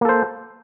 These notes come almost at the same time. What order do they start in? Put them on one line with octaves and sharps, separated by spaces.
A#3 A4 C5